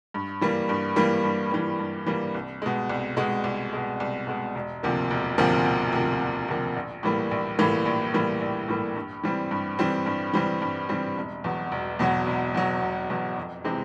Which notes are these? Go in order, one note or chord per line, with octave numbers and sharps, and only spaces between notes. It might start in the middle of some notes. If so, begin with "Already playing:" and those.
G2
E3 G3 A#3
G2
E3 G3 A#3
G2
E3 G3 A#3
G2
E3 G3 A#3
C2
B2 G#3
C2
B2 G#3
C2
B2 G#3
C2
B2 G#3
E1
D2 C3 F3 A#3
E1
D2 C3 F3 A#3
E1
D2 C3 F3 A#3
E1
D2 C3 F3 A#3
A#1
A2 E3 G3 A#3
A#1
A2 E3 G3 A#3
A#1
A2 E3 G3 A#3
A#1
A2 E3 G3 A#3
G2
E3 G3 C4
G2
E3 G3 C4
G2
E3 G3 C4
G2
E3 G3 C4
E1
E2 B2 F#3
E1
E2 B2 F#3
E1
E2 B2 F#3
E1
E2 B2 F#3
F2
C3 E3 G#3 C4